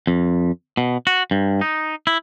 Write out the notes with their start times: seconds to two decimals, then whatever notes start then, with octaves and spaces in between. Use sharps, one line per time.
0.07 F2
0.77 B2
1.07 F#4
1.31 G2
1.61 D#4
2.07 E4